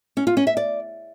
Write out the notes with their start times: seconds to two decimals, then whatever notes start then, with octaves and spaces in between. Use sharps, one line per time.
0.17 C#4
0.27 F4
0.37 C#4
0.47 E5
0.57 D5